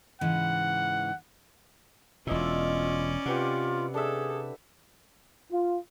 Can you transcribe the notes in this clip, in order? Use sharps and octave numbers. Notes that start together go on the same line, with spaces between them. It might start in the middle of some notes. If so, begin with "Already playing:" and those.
G#2 C#3 E3 F#5
E1 B2 C#4 E4 F4 D5 D#5 E6
C3 F4 G4 B4 F#5
D4 G#4 A4 E5
F4